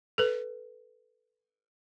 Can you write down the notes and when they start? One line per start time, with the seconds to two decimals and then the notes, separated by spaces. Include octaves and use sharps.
0.18 A4 B4